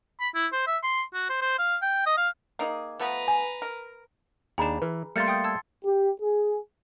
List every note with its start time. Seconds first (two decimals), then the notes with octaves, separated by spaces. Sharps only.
0.20 B5
0.35 E4
0.53 C5
0.67 E5
0.83 C6
1.14 F#4
1.29 C5
1.42 C5
1.59 F5
1.82 G5
2.06 D#5
2.17 F5
2.59 A#3 D#4 G#4
2.99 F3 A3 B3 B4 A#5
3.28 G#5
3.62 A#4
4.58 D#2 D4 G#4 G#5 A#5 B5 E7
4.82 E3 B4
5.16 G3 A3 A#3 F5 C6 F6 A6 C#7
5.28 G5 D#6 G6
5.44 A5 E6 G#6
5.85 G4
6.20 G#4